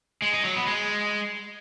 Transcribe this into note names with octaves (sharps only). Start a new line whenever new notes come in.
G#3
D#4
F#3
B3
G#3